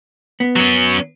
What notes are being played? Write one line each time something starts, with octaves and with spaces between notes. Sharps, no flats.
B3
F#3 C#4